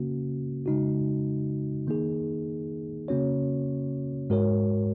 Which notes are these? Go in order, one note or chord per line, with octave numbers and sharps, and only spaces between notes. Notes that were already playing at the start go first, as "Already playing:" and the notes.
Already playing: C#3 A#3 C#4 F#4
C#3 G#3 D#4 F#4
D#3 A#3 D#4 G#4
C#3 A#3 C#4 F#4 C#5
G#2 G#3 F#4 A#4 C#5